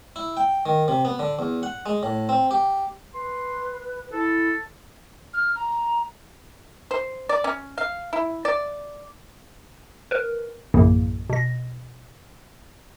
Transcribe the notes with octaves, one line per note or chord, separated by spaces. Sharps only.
E4
G5
D#3
C3
B3
D3
E2
F#5
G#3
A2
C4
G4
B4 C6
E4 A4
F6
A#5
C5
D5
C#4
F5
E4
D5
A#4 B4
A#1 F#2 A2 C#3 A#3
B2 A#6